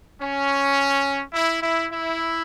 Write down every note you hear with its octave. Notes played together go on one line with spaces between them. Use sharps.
C#4
E4
E4
E4